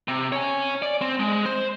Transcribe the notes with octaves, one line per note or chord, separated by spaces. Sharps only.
C3
C#5 G#5
D5
C4
G#3
C5